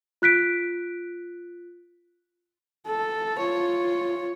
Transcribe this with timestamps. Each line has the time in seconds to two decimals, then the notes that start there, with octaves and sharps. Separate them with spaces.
0.22 F4 F#6 B6 D7
2.86 A4
3.39 F4 C#5